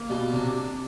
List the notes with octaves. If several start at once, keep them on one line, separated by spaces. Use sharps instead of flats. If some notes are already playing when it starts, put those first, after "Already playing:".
Already playing: A#3
B2 G3
C3 D4